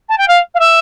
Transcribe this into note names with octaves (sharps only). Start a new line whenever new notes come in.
A5
G5
F5
F5
E5